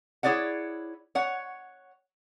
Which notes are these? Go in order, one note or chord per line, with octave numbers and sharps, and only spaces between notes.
E4 G#4 C#5 D5 F#5
C#5 F#5